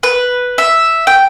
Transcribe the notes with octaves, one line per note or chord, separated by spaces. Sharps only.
B4
E5
G5